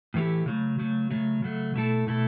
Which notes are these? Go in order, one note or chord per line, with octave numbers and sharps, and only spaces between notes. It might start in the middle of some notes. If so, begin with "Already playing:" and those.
A2 E3 A3 E4 G4
C#3 F#3 A3
C#3 F#3 A3
C#3 F#3 A3
C#3 F#3 A3
B2 A3 E4 A4
B2 A3 E4 A4